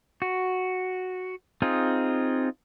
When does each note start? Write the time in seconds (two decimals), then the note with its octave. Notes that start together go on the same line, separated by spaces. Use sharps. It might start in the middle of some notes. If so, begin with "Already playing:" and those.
0.22 F#4
1.62 C4 D#4 F4 G#4